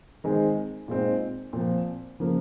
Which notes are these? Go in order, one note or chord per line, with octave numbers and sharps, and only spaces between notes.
D#3 G#3 C4
A#2 G#3 C4 D#4
A#2 F3 C4
C#3 F3 A#3